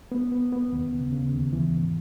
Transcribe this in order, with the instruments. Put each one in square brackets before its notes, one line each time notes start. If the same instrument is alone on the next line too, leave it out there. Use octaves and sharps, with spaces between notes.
[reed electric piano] B3
B3
B3
D#2
C#3
C#3
D#2
E3
G#2